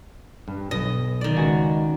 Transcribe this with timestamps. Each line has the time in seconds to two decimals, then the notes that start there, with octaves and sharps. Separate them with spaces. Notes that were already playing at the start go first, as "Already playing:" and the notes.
0.48 G2
0.71 B1 D#5
1.21 D#3 D5
1.37 C#2 F#4 G#5